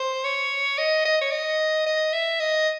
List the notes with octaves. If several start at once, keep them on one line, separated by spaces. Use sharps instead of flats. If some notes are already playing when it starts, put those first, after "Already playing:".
Already playing: C5
C#5
D#5
D#5
C#5
D#5
D#5
E5
D#5